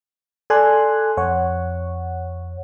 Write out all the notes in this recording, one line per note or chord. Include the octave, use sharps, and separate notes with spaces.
A4 D5 G#5 C6 F#6
F2 C#5 F#5